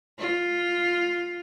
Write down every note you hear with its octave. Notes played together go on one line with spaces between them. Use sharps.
F4